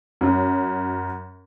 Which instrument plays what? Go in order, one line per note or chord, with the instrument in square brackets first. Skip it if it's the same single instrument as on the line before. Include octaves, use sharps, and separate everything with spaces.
[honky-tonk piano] F#2